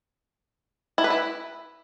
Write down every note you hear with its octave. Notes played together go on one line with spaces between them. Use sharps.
E4
B4
E4